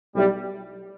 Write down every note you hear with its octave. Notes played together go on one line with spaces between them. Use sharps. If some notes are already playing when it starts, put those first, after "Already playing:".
B1 A2 G3